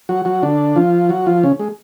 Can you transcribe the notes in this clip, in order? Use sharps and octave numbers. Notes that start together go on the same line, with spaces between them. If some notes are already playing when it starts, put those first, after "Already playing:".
F#3 F#4
F#3 F#4
D3 D4
F3 F4
F#3 F#4
F3 F4
C#3 C#4
G#3